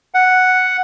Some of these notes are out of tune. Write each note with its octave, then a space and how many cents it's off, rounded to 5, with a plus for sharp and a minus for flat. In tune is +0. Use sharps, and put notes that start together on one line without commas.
F#5 +0